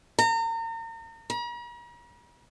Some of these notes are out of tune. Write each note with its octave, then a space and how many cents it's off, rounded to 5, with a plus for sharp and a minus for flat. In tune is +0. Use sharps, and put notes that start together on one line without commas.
A#5 -35
A#5 +45